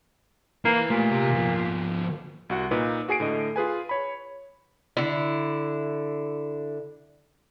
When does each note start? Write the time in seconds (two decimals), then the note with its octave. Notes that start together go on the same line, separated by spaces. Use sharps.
0.65 A#3 E4 B4
0.90 A#2 A3 G#5
1.11 C3 G4
1.35 F3 B3
2.50 C2 F#4 F#5
2.71 A#2 D#4 B4
3.08 F#4 G#4 G#5 C7 D7
3.20 A2 D3 D#5
3.56 F4 G#4 B4 G#5
3.89 C#5 B5
4.97 D3 E4